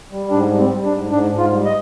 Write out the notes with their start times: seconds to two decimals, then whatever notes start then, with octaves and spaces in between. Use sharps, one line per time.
0.12 G3
0.31 G#2 D4
0.51 G3
0.58 C4
0.72 G3
0.85 D4
0.91 G#2
1.11 G#2 D4
1.31 G#2
1.38 F4
1.51 G3
1.65 D#5